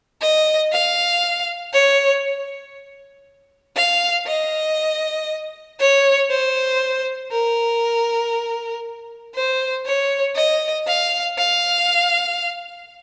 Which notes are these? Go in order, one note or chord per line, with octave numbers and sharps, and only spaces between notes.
D#5
F5
C#5
F5
D#5
C#5
C5
A#4
C5
C#5
D#5
F5
F5